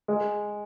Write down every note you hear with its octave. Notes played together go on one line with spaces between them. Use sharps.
G#3